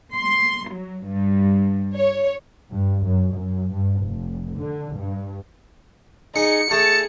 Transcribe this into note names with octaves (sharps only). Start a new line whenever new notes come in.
C6
F#3
G2
C#5
G2
F#2
F#2
G2
F1
D3
G2
D#4 G#4 C#7
A3 G#4 A5